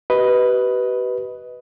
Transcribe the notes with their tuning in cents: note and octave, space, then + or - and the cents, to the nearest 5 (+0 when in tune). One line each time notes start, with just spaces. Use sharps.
G4 -40 B4 +0 D#5 +10